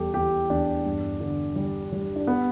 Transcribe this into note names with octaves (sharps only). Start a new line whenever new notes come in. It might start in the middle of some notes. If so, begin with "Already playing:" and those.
Already playing: E2 G3 G4 A4
E2 G4
E2 D4
G2
D3
G3
G3
D4
B3